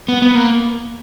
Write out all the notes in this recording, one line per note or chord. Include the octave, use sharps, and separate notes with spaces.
B3
B3
A#3